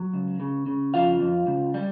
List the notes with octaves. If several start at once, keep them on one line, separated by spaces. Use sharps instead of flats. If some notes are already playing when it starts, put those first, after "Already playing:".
Already playing: F#3
C#2
C#3
C#3
F2 F4 F5
F2
C#2
G3